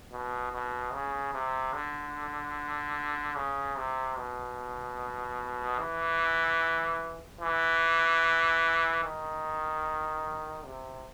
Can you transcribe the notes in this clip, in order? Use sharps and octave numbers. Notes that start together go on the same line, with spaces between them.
B2
B2
C#3
C3
D3
C#3
C3
B2
E3
E3
D#3
C3